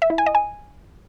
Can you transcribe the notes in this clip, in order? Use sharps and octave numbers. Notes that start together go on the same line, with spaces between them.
E5
E4
G#5
D#5
G#5